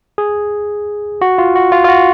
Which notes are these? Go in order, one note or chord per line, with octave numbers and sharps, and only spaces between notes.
G#4
F#4
F4
F#4
F4
F4
F#4